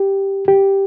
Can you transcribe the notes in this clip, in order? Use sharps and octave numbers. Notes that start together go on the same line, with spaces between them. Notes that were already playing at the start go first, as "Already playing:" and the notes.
Already playing: G4
G4